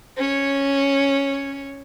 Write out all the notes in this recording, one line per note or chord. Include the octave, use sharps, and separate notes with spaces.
C#4 C#5